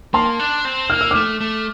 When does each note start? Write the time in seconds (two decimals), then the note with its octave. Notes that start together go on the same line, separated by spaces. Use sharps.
0.14 A#3 A5 C6
0.40 D4
0.65 C4
0.90 A#3 F6
1.01 E6
1.11 A3 D6 F6
1.40 A3